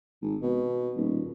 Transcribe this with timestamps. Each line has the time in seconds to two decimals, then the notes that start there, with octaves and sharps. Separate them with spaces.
0.22 G#1
0.42 B2
0.96 D#1